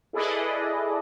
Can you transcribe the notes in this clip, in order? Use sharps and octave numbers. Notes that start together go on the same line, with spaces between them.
E4 G#4 A4 B4 D5 D#5